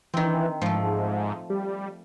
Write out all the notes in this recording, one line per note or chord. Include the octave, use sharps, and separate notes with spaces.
D#3 E3 C4
G#2 F3 A3
G3